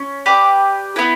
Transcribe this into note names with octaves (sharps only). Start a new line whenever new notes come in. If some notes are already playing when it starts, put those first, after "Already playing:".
Already playing: C#4
G4 B4 D5
B3 E4 B4